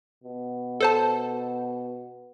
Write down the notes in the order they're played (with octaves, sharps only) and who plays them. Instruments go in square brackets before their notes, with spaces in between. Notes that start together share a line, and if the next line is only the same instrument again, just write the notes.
[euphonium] B2
[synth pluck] A4 C5 A5